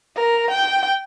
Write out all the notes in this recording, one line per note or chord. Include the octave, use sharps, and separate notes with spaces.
A#4
G5